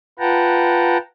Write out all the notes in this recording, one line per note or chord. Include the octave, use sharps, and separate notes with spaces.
F4 B4 F#5 G5 A5 A#5